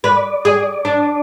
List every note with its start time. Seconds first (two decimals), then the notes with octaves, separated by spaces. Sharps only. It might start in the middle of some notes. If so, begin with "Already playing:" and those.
0.04 B4 D5
0.45 G#4
0.85 D4